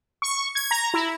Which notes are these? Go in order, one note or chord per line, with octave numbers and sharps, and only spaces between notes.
C#6
G#6
A#5
E4